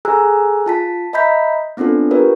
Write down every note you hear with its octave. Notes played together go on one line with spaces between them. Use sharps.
G#4 A4 G#5 A#5 E6 F#6
F4 A5 B6
D#5 E5 A#5 B5 G6 B6
B3 C4 D4 F4 A4
F4 G4 A#4 B4 C#5